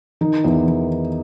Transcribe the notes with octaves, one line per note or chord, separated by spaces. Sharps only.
D#3 D#4
E2 E4
D#3